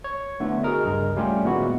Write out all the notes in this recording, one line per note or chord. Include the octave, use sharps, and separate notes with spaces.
C#5
D3 A3 B3 E4
F#4 G#4 A#4 D#5
C#2 G2 G#3 A#4
G3 A3 C#4 F4 G4
A#2 D#3 G#3 B3 E4 F#4